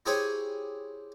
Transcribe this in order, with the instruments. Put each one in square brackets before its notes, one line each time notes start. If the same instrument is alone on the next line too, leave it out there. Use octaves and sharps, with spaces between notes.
[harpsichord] E4 G4 G#4 C5 C#5